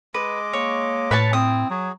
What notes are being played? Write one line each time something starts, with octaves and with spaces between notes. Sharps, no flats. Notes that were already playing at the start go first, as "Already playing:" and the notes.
G#3 B4 D#5 D6
A#3 C#5
A2 B4 C#5 A5
C4 E4 D#6
F#3 F#4 G#4